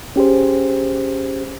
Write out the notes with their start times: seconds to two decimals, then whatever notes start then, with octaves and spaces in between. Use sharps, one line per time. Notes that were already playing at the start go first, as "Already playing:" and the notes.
0.16 C#4 G4 G#4 C5